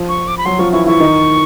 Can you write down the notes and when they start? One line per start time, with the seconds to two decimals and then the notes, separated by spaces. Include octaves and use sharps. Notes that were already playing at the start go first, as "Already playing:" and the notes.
Already playing: F3 F4
0.09 C#6
0.28 D6
0.38 B5
0.45 F#3 F#4 C6
0.59 F3 F4 C#6
0.73 E3 E4 C#6
0.86 E3 E4 C#6
1.00 D#3 D#4